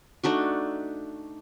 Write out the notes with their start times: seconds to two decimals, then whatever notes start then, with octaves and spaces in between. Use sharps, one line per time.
0.23 A3 D4 D#4 F#4